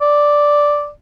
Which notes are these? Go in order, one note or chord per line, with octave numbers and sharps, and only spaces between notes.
D5